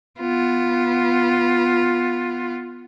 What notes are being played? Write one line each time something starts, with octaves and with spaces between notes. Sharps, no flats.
B3 F4